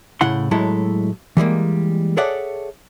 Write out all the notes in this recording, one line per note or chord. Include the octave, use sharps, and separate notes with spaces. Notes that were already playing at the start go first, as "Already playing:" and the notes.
A2 C#3 E4 F#5 C6
A2 F#3 G#3 E4 A4
E3 G3 G#3 A#3
G#4 A4 C#5 D5 E5 F#5